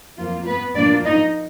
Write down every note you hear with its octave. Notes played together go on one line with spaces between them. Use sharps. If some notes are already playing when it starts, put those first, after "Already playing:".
F2 F3 A#3 F4
B3 B4
A#2 F3 A#3 D4 F4 D5
D#4 D#5